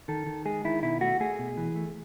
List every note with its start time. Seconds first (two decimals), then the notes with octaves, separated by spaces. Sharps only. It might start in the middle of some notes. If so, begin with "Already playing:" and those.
0.08 D#3 A4
0.27 D#3
0.45 G#3 G#4
0.65 D#3 E4
0.83 B2 E4
1.01 A3 F#4
1.20 A3 G#4
1.39 B2
1.57 E3
1.76 A3